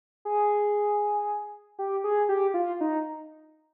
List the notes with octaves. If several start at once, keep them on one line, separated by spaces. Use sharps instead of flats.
G#4
G4
G#4
G4
F4
D#4